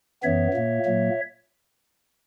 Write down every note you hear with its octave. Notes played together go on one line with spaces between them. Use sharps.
F#2 E3 B3 C#5 E5
A#2 A#3
A#2 F#3 A#3